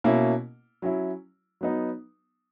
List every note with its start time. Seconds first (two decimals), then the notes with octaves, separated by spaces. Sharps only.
0.04 B2 A#3 C#4 E4
0.82 F#3 C#4 E4
1.61 F#3 B3 D#4